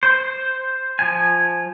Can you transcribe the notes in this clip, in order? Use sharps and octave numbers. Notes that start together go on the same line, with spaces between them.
C5
F3 G#5